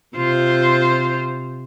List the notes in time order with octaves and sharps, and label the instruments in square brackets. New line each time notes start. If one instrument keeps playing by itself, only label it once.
[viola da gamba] C3 F4 C5